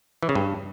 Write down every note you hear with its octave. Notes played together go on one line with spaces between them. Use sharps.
E3
C#3
G2